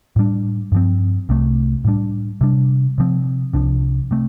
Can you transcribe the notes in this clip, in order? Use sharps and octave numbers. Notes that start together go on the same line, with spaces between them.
A2 G3 D4
G2 F3 C4
C2 C3 A3
A2 G3 D4
C3 G3 D4
C3 F3 C4
C2 C3 F3 D4
C3 A3 C4